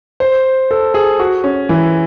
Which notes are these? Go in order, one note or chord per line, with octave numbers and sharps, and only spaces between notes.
C5
A4
G#4
F#4
C#4
E3